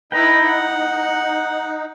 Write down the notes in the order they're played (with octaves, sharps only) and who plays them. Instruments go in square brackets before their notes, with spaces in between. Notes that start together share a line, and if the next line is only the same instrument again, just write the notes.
[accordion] D#4 [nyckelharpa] E4 B4 [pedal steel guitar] G5 A#5
[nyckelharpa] F#5